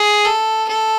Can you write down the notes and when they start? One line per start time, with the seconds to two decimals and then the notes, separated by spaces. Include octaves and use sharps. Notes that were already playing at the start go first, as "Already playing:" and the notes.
Already playing: G#4
0.25 A4
0.68 A4